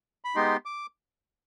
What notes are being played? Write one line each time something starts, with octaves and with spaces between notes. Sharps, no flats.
B5
G#3 B3 D#4 G4 C6
D6